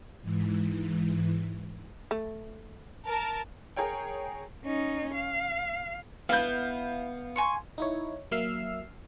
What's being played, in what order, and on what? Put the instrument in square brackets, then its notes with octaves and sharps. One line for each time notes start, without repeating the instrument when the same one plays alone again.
[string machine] G#2 E3
[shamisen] A3
[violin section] A#4 A5
[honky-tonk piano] G#4 A#4 C#5 G5
[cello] C#4 D#4
F5
[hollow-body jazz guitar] B3 B4 [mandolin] E4 [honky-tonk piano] F5 G6
[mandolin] G#5 C6 C#6
[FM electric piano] D#4 E4 C#5
F#3 A#3 E5 E6 F6 C7